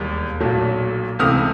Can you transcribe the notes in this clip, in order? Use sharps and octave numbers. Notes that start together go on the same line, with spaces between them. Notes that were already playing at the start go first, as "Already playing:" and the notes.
Already playing: E1 D#2 G3 A#3
B1 A#2 F#3 A3
C#2 C3 E3 A3 D#6 F6